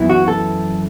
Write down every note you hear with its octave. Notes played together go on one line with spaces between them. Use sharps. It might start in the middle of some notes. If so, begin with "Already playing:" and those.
Already playing: F#2 E3 B3 E4
F#4
A4